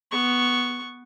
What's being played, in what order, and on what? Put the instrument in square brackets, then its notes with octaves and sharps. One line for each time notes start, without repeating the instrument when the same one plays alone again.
[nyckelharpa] B3 C#6